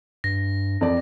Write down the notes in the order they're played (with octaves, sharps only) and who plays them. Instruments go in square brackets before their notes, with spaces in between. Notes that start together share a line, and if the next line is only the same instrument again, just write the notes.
[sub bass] G2 [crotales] A#6
[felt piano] F2 D5